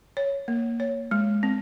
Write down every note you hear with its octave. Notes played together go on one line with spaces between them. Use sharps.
C#5
A#3
C#5
G#3
C4